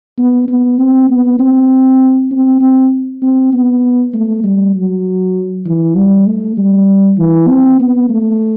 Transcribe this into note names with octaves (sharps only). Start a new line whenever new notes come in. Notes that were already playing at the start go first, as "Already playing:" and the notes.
B3
B3
C4
B3
C4
C4
C4
C4
B3
A3
G3
F#3
E3
G3
A3
G3
E3
C4
B3
A3